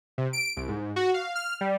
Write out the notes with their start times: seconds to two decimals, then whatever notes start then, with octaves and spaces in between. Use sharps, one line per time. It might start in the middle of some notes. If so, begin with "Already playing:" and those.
0.18 C3
0.33 D7
0.57 C2
0.68 G#2
0.96 F#4
1.14 F5
1.35 F6
1.61 G3